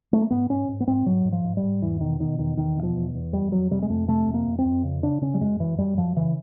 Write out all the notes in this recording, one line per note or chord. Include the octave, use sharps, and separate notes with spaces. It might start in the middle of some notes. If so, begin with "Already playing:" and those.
A3
A#3
G#2 B3
G#2 C#4
G#2
B3
G#2 C4
G#2 F#3
G#2
F3
G#2
G3
G#2
E2 E3
B2 D#3
B2 D#3
E2 D#3
E2 D#3
B2
F3
E2
E2
F2 G3
F2 F#3
C3 G3
G#3
F2 A3
C3 A3
F2
A#3
F2
C4
F2
C#3
C#3 D4
C#3 C#4
G3
F#2 G#3
F#2 E3
F#2 G3
F#2 F3
C#3 E3